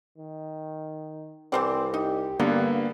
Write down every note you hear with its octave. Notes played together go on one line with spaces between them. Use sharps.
D#3
C2 E3 C4 C5 D5
D#4 G4
G2 D3 F#3 G3 A#3 B3